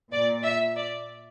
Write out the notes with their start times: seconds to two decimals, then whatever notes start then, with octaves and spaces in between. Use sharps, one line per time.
0.12 A#2 D5
0.44 E5
0.76 D5